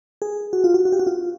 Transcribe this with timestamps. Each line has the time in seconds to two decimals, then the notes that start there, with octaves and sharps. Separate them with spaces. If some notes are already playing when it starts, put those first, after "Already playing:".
0.22 G#4
0.53 F#4
0.64 F4
0.74 F#4
0.85 F#4
0.92 G4
0.99 F#4
1.07 F4